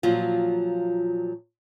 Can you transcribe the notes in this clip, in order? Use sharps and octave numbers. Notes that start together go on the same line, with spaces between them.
A#2 F3 F#3 F4